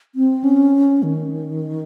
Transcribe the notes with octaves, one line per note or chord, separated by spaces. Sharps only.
C4
C#4
D#3